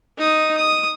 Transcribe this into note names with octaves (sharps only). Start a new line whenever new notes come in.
D#4 D#6
D#6